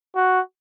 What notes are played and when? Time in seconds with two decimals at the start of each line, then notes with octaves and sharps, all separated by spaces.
0.16 F#4